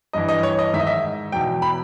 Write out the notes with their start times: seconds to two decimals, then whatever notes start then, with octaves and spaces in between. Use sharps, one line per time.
0.13 G2 E3 D#5
0.28 D#5
0.43 C#5
0.59 D#5
0.74 G#2 D#3 E5
0.80 D#5
0.87 E5
1.32 E2 B2 G5
1.62 B5